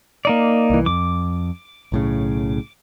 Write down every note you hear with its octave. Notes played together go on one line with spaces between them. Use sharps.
A#3 D#4 D5
C2 E3
F2 D6
B1 A2 C#3